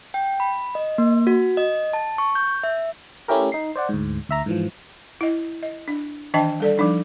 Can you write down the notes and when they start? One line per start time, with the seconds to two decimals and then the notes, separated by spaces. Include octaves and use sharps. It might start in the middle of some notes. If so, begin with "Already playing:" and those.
0.14 G5
0.40 B5
0.75 D#5
0.98 A#3
1.27 F#4
1.57 D#5
1.93 A5
2.18 C#6
2.35 G6
2.63 E5
3.28 A3 C#4 E4 G4 A#4
3.52 D#4 C7
3.76 C5 D5 F#5
3.89 D2 G#2
4.29 D2 E5 A#5
4.46 G#2 E3 F3
5.21 E4 D#5
5.63 D#5
5.88 D4
6.34 D#3 E3 D4 D#5 G5 A5
6.60 G3 A4 D5
6.78 F3 G3 D4 D#4